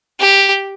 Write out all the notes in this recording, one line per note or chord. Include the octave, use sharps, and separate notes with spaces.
G4